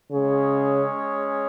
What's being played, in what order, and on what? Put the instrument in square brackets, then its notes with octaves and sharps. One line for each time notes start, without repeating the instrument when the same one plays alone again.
[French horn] C#3 [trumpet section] G#3 C#4 G#4 C#5